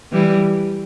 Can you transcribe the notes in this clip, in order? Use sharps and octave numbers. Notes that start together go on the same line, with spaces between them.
E3 G3